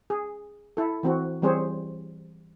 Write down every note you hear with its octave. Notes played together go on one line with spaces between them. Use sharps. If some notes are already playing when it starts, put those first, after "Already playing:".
G#4
E4 A4
E3 C4 F#4
E3 G3 C4 G#4 C5 C#5